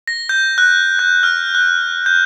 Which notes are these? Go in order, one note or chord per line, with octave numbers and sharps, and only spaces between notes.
A#6
G6
F#6
G6
F6
F#6
G6